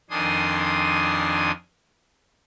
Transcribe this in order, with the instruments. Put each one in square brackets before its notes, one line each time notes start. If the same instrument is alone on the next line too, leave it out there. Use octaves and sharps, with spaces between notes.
[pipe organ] F2 D#3 D4 G#5 C6 D#6